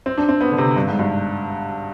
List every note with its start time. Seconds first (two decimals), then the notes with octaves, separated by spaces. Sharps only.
0.06 C4
0.17 D4
0.29 C4
0.41 B3
0.52 D3
0.58 C3
0.76 G2
0.87 G#2
0.99 G2